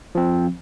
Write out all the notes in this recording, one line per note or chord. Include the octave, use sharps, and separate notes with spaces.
F3 C4